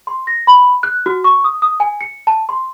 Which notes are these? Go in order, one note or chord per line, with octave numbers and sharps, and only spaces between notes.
C6
A#6
B5
F#6
F#4
C#6
D#6
D#6
G#5
C#7
A5
C6